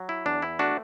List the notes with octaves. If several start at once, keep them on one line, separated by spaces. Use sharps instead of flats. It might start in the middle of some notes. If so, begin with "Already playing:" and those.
Already playing: F#3
E4
E2 D4
E4
A3 D4 F#4